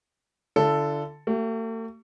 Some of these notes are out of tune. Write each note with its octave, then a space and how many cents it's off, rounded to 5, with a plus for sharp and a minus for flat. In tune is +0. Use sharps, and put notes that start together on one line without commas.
D3 +0 F4 -45 A4 +0
A3 +45 G4 -35